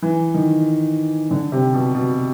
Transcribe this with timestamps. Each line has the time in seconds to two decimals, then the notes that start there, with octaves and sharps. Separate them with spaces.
0.02 E3
0.34 D#3
1.31 D3
1.52 C3
1.74 B2
1.94 B2